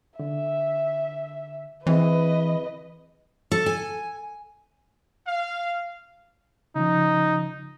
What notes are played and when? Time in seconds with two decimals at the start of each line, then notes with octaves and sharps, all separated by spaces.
0.19 D3 E5
1.86 E3 C4 E4 G#4 B4 D#5
3.52 A4
3.66 G#5
5.26 F5
6.75 C#3 F3 D#4